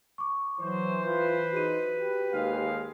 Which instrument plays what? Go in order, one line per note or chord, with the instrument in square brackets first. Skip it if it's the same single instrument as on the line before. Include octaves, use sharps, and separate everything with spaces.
[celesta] C#6 D6
[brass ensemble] E3 C5 [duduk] F#3
[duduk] F4 [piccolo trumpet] B4 [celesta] C6
[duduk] D#4 [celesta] F#4 G#4 D#7
[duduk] G4
[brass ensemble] D#2 G#3 F5